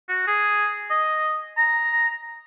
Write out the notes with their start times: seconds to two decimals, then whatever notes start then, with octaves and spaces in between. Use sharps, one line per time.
0.09 F#4
0.27 G#4
0.90 D#5
1.57 A#5